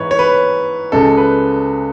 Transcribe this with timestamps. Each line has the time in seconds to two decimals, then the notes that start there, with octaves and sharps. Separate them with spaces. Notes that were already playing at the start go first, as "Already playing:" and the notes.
Already playing: G#2 E3 G#3 B4 C#5
0.11 C#5
0.19 B4
0.92 C#2 C#3 G#3 A4
1.17 B4